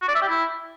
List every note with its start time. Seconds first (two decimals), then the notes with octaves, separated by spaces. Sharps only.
0.02 F#4
0.08 D5
0.15 E5
0.22 G4
0.28 E4